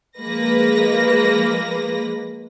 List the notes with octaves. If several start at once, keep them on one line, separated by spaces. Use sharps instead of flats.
F3 G#3 A#3 B4 A#6